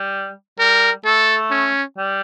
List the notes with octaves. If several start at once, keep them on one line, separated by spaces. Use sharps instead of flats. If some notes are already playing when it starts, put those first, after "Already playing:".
Already playing: G3
G3 A#4
A3 A4
C#4
G3